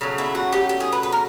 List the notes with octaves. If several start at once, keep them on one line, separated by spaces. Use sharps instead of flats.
C#3 F#3 A3
E4
F#4
G4
G4
G#4
B4
B4
A#4